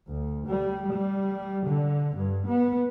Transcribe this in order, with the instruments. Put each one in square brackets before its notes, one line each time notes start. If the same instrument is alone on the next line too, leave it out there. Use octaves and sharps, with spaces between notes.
[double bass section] D2
G3
G3
D3
G2
B3